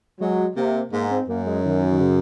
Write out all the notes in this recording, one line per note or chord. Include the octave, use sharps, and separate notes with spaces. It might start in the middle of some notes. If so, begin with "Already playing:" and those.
F#3 G#3
C3 A#3
G#2 A#3
C4
F#2 A#3
G#3
D#3
D#3
C#3